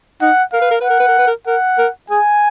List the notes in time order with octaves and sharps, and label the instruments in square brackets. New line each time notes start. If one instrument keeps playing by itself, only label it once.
[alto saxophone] D#4 [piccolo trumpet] F#5
[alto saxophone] A#4 [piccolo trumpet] F5
[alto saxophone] B4
A#4
[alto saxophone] B4 [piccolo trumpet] F#5
[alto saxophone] A#4
B4
A#4
B4
A#4
[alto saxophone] A#4 [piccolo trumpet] F#5
[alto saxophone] A#4
[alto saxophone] G#4 [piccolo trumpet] G#5